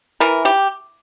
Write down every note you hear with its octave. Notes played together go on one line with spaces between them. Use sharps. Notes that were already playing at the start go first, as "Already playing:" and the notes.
E3 A#4
G4